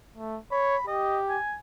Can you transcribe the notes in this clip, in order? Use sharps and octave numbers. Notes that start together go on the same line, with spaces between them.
A3
C#5 B5
G4 D#5
G#5